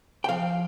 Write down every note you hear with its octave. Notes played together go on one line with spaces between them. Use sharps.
G5
F3 F5